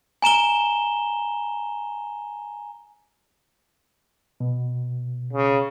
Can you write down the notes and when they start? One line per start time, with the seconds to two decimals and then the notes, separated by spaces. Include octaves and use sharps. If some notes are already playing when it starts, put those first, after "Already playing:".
0.22 G#5 A#5 E7 G7
4.40 B2
5.33 C#3